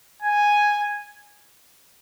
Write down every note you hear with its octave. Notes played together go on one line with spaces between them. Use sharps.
G#5